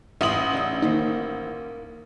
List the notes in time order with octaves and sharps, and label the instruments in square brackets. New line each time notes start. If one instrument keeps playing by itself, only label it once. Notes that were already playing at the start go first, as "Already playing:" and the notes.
[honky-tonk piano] A1 D#6 F#7 [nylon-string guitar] G4 [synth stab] E5 C6
[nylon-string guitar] C#3 D#4 [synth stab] D4 E5
[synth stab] D#3 D#4 [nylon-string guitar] A#3 C5